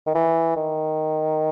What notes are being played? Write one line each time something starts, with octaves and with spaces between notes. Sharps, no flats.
D#3
E3
D#3